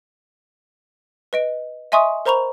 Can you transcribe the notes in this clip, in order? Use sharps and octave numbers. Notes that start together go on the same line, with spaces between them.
B4 D#5 D7
D#5 E5 G#5 C6 C#6 D#6
A#4 C5 A#5 B5 C#6 F7